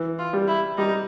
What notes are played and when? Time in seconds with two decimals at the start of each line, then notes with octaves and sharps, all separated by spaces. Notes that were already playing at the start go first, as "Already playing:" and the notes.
Already playing: E3
0.19 F4
0.33 G3
0.48 E4
0.78 G3 D#4